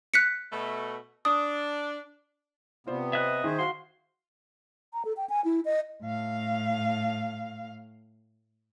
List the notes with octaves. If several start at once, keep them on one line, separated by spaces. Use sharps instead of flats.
F#6 B6 C#7
B2 A3
D4 D#6
C3 B3 F4 C5 D5
D#5 E5 F#6
D#3 G#4 C5
F#4 F5 F#5 C6
A#5
A4
G5
G#5
E4
D#5
A2 F5